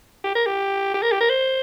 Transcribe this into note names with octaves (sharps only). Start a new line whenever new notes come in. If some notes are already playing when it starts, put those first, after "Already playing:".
G4
A#4
G4
G4
A#4
G4
A#4
C5